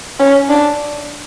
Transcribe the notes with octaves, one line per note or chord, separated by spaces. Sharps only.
C#4
D4